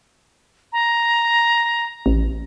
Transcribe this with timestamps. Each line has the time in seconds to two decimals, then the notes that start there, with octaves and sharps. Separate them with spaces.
0.73 A#5
2.06 A1